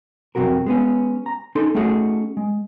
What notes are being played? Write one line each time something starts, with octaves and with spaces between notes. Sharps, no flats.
F2 C3 F3 F#3 F#4 A#4
G#3 B3 C#4
A#5
C#4 D#4 A4 C6
A3 C#4 D#4 F#4 G#4 A4
G#3